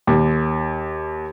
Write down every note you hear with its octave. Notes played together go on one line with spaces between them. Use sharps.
D#2